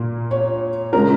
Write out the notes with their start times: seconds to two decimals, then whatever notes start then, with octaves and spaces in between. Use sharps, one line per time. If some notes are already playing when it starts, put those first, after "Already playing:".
Already playing: A#2 A#3
0.31 C#5
0.93 C#3 G#3 A#4